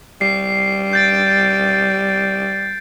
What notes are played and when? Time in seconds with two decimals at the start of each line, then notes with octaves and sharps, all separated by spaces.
0.21 G3 C7
0.93 G6 A6 D7